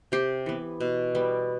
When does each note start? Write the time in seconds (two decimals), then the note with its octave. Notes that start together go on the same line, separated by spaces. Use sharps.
0.12 C3 G4
0.46 E3 B3
0.80 B2
1.15 G3 B3